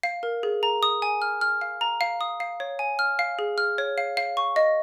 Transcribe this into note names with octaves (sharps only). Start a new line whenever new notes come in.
F5
A#4
G#4
A#5
D#6
G#5
F6
F6
F5
A#5
F5
D#6
F5
C#5
G#5
F6
F5
G#4
F6
C#5
F5
F5
C#6
D#5